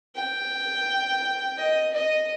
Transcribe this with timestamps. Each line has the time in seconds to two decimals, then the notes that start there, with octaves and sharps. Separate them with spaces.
0.16 G5
1.58 D#5
1.93 D#5